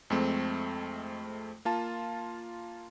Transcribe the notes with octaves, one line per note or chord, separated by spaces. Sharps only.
F2 G#3 A3 C4
A#3 F4 A5